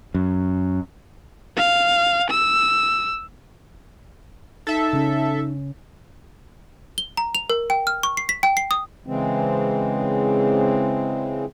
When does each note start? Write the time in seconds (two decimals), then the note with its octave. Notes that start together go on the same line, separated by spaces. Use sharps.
0.15 F#2
1.56 F5
2.31 E6
4.67 D#4 A4 E5
4.93 C#3 C#4
6.98 G7
7.17 A#5
7.35 F7
7.50 A#4
7.70 G5
7.87 F6
8.03 C#6
8.17 C7
8.29 B6
8.43 G5
8.57 C7
8.71 D#6
9.07 C#3 E3 G#3 C4